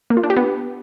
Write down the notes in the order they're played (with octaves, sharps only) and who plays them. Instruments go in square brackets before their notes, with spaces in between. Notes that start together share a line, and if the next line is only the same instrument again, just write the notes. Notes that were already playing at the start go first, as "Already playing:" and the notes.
[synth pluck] A#3
F4
D4
G4
B3